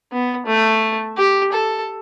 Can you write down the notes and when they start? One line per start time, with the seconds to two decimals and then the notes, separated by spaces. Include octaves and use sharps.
0.12 B3
0.46 A3
1.18 G4
1.52 A4